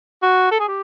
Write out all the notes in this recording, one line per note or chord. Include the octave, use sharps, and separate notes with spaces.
F#4
A4
G#4
G4